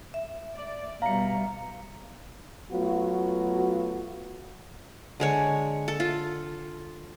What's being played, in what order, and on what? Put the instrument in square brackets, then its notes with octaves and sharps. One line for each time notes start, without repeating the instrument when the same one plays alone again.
[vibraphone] E5
[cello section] D5
[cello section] B2 G3 [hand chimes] F5 C#7 [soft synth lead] A#5
[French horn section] F#3 A3 B3 F4 F#4
[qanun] D3 G#3 C#5
A4
F4